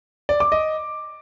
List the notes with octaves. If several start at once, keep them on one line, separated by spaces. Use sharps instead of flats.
D5
D6
D#5